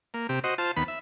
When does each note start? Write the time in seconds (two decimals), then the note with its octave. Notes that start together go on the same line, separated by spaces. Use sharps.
0.14 A#3
0.29 C3 G4
0.44 F#4 C5 D#5
0.58 F4 C5 A5
0.77 D#2 B3 B5
0.88 E5